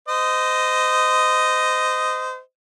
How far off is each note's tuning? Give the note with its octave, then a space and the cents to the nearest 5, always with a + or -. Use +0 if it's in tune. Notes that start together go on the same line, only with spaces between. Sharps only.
C5 -30 D#5 +0